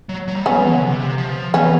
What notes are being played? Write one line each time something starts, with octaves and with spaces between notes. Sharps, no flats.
F#3
F#3
G3
F#3 B3 C#4
F3
E3
D3
C3
F3
E3 B3 C#4